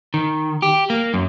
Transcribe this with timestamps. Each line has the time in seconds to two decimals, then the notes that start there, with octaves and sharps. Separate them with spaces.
0.14 D#3
0.62 G4
0.90 A#3
1.14 F#2